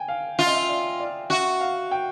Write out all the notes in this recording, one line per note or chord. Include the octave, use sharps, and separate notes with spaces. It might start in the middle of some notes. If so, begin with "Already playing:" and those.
Already playing: G5 G#5
F5
F4 E5
D#5
E5
D5
D5
F#4 E5
F5
G5